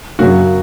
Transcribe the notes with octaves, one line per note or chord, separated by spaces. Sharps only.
F#2 C#3 F#3 A#3 F#4